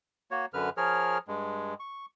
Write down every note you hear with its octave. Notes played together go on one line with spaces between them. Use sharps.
A#3 F#4 C#5
F#2 D3 B4 F6
F3 G#4 A#4 C#5 F6
G2 G#3
C#6